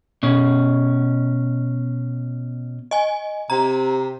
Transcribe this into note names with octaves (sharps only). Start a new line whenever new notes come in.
B2 C#4
D#5 G#5
C3 A#5